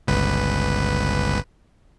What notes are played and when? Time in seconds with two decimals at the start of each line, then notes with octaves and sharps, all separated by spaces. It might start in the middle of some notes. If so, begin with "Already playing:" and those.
0.07 G1 C#2 B4